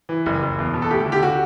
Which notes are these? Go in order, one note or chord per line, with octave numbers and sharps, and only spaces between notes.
E3
F#1
F#1
E2
B2
A4
D2 G4
D3
G4
D3 F#4